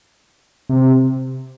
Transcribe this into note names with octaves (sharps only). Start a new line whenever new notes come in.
C3